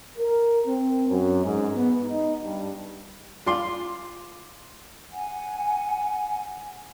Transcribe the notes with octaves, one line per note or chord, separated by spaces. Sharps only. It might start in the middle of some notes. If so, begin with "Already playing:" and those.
A#4
C4
F#2
G#2
B3
D#4
G2
F4 D5 C6
F#5 G#5